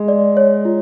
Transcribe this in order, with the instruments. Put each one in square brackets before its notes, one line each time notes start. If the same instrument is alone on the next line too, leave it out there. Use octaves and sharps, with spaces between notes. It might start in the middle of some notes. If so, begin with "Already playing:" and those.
Already playing: [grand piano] G#3
[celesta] D5
C#5
F4